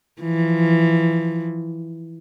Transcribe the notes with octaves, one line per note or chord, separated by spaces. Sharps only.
E3 F3